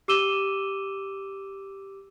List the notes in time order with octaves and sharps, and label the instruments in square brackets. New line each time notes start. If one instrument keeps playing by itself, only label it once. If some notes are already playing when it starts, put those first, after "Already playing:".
[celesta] G4 D6 E6 D#7 E7 G7